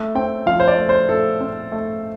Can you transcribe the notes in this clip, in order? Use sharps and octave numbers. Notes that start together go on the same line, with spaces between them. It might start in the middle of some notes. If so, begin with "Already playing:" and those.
Already playing: A3
C4 G5
F3 F5
C5
D5
A3
C5
A3 A4
C4
A3